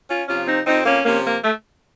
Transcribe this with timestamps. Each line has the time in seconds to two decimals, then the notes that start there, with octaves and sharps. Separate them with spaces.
0.09 C#4 F4
0.28 C3 F3 C#4 F4
0.48 C4 D#4
0.67 F2 C4 D#4
0.86 A#3 C#4
1.05 C3 F3 A#3 C#4
1.25 A#3
1.44 A3